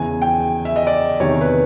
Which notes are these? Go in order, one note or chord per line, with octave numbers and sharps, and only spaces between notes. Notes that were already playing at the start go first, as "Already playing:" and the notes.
Already playing: E2 C#3 E3 G#5
G5
E5
D#5
D5
E2 C3 D#3 C#5
B4